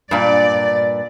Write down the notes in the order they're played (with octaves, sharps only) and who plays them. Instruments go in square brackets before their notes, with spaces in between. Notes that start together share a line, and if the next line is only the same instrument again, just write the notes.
[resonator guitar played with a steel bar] G2 A#2 [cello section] D5